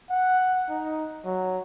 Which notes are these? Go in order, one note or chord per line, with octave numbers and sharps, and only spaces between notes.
F#5
D#4
F#3